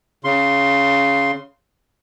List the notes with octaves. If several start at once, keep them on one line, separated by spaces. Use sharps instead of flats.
C#3 C6